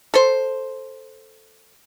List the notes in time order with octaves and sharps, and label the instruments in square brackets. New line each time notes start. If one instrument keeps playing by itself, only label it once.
[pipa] A4 C5